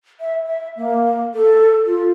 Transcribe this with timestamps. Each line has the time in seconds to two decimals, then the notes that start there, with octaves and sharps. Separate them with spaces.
0.20 E5
0.45 E5
0.77 A#3
1.34 A4
1.86 F4